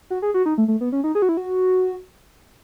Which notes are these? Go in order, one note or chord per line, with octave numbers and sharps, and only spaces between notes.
F#4
G#4
F#4
D#4
A3
A3
B3
C#4
D#4
G#4
F#4
E4
F#4